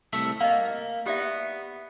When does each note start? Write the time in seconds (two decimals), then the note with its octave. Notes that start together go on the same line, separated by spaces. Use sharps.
0.13 C2 A3 E5
0.41 A#3 D#5 F5
1.06 B3 G4 D5 E5